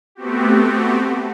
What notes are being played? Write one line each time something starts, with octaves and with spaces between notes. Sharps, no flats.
A3 B3 C4 F#4 G4